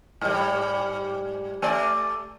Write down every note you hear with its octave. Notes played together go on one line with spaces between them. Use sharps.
G#2 G3
A3 D5